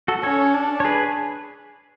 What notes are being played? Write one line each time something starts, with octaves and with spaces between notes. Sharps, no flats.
F#4 A4
C#4 A4 C#5
D4
C#5
G#4 B4